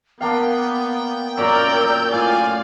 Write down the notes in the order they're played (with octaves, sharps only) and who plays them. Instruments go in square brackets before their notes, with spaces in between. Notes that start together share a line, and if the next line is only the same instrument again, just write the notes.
[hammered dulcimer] A#3 D4 F5 [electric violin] B3 [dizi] G5
[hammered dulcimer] F#2 A#2 [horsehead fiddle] A#4 D5 [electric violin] E6 G6
[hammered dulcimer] A2 [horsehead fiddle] F4 [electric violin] D5 F5 [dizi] G#5